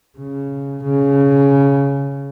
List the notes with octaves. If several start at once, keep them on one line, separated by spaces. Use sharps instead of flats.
C#3
C#3